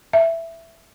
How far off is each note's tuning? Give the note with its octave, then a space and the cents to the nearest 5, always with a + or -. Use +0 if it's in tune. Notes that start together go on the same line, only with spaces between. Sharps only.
E5 +5